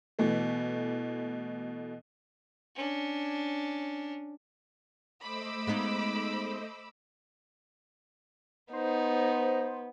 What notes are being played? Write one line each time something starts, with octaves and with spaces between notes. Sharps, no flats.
B2 E3 A3
C#4 D4
A3 C5 D#5 B5 D6 E6
G#3 B3 D#4
B3 D#4 C5